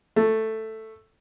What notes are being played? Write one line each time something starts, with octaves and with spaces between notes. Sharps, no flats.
A3